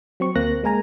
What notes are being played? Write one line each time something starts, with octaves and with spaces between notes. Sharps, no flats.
F#3 C4 C#6
D2 A#3 C4 F#6 A#6
G#3 A#3 A#4 G#5 A#5